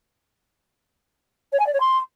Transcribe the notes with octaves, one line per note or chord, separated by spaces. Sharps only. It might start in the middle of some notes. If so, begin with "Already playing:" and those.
C#5
G#5
D5
C#5
C6